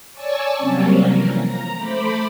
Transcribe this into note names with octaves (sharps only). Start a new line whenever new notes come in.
C#5 D5 G#5 A5 C#6 E6
C3 F#3 G3 A#3 C4 C#4
E3 F3 A#4
A#5
A3 C5 B5 D6